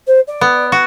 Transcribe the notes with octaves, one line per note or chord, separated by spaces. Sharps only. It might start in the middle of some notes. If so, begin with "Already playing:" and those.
C5
D5
B3
F#4